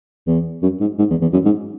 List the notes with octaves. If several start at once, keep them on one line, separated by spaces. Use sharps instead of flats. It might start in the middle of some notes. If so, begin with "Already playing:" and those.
E2
F#2
G#2
G#2
E2
E2
F#2
G#2